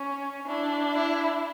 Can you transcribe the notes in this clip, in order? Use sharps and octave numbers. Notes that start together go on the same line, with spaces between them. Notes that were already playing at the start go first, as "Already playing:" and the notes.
Already playing: C#4
D4 E4
E4